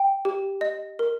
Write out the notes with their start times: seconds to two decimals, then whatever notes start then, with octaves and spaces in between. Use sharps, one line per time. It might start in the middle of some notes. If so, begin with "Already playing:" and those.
Already playing: G5
0.25 G4
0.61 D#5
0.99 A#4